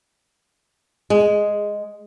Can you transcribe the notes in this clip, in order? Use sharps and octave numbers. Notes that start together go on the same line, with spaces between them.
G#3